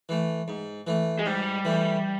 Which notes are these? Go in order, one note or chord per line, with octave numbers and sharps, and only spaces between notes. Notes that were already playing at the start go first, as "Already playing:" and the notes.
E3 A3
G#2
E3 A3
G#3
G#2 G3
E3 A3